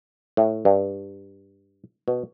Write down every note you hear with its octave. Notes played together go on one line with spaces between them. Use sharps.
A2
G2
B2